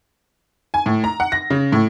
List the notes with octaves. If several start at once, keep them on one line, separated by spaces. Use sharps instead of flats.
G#5
A2
A#5
F#5
A#6
C#3
A2